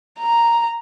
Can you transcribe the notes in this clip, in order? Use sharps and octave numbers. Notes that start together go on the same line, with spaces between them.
A#5